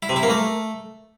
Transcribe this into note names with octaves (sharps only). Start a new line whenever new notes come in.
E4
C3
E4
A#3
A3